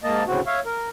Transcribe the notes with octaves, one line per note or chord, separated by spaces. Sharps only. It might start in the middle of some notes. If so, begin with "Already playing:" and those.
G#2 A#3 D#5 A5
D2 A2 C#3 C4 F#4
C#5 E5 F5
A#4